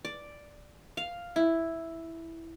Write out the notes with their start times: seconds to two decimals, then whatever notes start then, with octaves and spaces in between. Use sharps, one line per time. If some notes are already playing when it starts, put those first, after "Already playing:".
0.05 D5
0.97 F5
1.36 E4